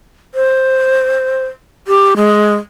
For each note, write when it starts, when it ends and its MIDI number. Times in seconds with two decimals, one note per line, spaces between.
0.35 1.46 72
1.87 2.14 67
2.16 2.54 56